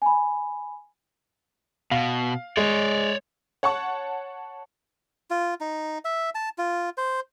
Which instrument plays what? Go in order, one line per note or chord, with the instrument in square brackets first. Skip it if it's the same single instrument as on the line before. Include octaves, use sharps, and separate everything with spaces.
[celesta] G#5 B5
[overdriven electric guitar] B2 [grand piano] F5
[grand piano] G#3 [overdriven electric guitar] C#5 D5
[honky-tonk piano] C#5 F#5 A5 C#6
[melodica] F4
D#4
E5
A5
F4
C5